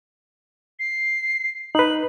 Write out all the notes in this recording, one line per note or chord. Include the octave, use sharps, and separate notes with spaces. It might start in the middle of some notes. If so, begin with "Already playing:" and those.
C7
D#4 B4 F#7